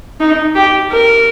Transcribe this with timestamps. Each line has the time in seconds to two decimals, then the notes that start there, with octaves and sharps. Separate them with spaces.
0.20 D#4
0.55 G4
0.92 A#4